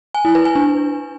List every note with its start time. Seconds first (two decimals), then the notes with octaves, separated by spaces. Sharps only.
0.14 G#5
0.25 E4
0.35 B4
0.45 G#5
0.56 D4